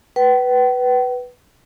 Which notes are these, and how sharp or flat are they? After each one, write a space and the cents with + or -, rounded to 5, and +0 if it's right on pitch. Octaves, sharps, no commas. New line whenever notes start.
B4 +0 G5 -45